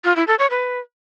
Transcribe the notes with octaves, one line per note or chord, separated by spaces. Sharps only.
F4
E4
A4
C#5
B4